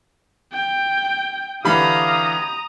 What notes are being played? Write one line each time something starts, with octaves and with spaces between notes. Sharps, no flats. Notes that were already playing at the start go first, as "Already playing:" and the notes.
G5
D3 E3 G4 F5 A#5 B5 D#6